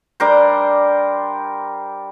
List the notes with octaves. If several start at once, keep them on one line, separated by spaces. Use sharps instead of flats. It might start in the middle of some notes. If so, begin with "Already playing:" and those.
G3 D4 A#4 C5